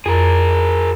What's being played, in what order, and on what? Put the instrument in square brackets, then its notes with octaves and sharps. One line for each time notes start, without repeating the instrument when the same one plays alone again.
[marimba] F2 [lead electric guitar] G#4 A#4